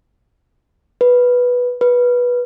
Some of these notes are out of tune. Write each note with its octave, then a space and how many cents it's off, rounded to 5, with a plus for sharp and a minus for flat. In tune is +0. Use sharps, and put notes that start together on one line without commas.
B4 -5
B4 -15